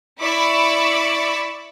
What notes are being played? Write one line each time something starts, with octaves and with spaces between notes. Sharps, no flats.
E4 D5 B5 C#6 D6 E6